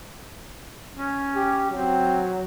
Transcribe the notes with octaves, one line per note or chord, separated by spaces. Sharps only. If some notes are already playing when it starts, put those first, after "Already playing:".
C#4
G4
F#3 C4